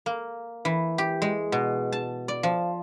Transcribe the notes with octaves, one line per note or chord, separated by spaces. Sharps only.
A#3
E3
G4
G#3
B2
A5
D5
F3